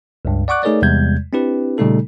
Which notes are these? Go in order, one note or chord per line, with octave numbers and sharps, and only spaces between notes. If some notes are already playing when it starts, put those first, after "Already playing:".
C#2 G2
D5 F#5 C#6 D6 F#6
A3 D#4 G#4 A#4 C#5 D5
E2 C3 G3 G#3 G6 G#6
C4 D4 E4 G4 B4
A#2 C#3 G3 A3 D#4 A4